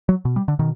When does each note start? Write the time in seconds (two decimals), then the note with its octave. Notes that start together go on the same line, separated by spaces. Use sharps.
0.09 F#3
0.25 B2
0.36 G3
0.48 D3
0.59 B2 D#3